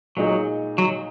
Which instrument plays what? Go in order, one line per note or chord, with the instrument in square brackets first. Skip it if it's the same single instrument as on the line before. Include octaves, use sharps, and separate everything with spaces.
[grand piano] A#2 G#3 D#4 G#4 [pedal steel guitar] F#3
[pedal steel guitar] F#3